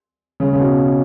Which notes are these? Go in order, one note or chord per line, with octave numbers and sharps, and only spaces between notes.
C#3
C#3
B2